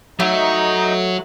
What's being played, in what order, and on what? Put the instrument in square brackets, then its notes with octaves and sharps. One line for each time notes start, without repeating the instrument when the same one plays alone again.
[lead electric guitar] F#3 F#4 [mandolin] A3 [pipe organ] D#4